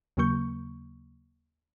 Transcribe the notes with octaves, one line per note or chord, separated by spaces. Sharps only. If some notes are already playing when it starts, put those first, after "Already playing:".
D#2 C#3 F#3 A#3 C#6 G6